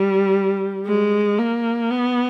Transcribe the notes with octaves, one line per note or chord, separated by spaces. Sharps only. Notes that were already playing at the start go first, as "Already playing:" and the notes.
Already playing: G3
G#3
A#3
B3